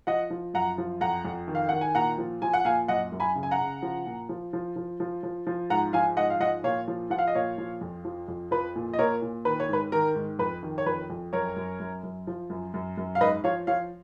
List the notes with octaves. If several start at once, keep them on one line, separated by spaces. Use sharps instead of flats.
F3 D#5 F#5
F3
F#2 F#5 A#5
F3
F2 F#5 A#5
F2
D#3
F5
D#3 F#5
G#5
A#2 F#5 A#5
F3
F3 G#5
F#5
A#2 F5 G#5
F#2 D#5 F#5
F#2
G#5 B5
C#3
G#5
F#5 A#5
C#3
F3
A#2
F3
F3
F3
F3
F3
F3
G#2 F#5 A#5
F3 F5 G#5
G#2 D#5 F#5
F5
F3 D#5 F#5
A#2 C#5 F5
F3
F3 F#5
F5
D#5
A#2 C#5 F5
F3
F2
F3
F2
F3 B4
A#2
D#5
A#2 A#4 C#5
A#2
D#3 B4
C#5
G#2 B4
D#3 A#4
G#2
F2 B4
D#3
C#5
F2 B4
F2
F#2 A#4 C#5
F#2
F#2
F#2
F3
F#2
F#2
F#2
F5
G#2 B4 D#5
F3 C#5 F5
F3 C#5 F5